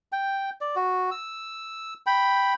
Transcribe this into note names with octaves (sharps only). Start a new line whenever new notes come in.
G5
D5
F#4
E6
G5 B5